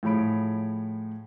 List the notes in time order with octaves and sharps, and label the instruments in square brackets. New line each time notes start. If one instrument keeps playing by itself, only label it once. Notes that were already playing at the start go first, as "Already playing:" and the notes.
[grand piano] A2 F3 G#4 C#5 B5 D7